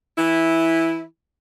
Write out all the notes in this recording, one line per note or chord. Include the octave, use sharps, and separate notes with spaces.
E3 E4